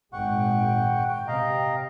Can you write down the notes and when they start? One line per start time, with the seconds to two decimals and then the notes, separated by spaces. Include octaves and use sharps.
0.13 G#1 A#2 G#3 F#5 G5 C#6
1.28 C3 D#5 F5 A#5